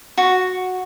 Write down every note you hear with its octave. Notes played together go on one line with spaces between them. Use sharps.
F#4